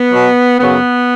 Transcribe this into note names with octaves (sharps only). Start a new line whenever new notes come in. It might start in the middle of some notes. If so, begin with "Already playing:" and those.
Already playing: B3
B2 F#3
F#2 C#3 F#3 B3